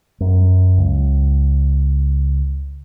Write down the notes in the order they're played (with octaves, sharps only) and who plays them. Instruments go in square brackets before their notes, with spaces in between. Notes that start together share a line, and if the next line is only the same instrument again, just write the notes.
[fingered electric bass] F#2
C#2